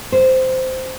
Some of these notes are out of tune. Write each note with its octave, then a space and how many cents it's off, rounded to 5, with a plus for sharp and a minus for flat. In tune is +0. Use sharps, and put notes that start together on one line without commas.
C5 -10